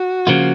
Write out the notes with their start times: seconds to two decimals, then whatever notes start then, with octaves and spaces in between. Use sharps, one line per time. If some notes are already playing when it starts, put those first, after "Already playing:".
Already playing: F#4
0.27 C#3 F3 A#3 F4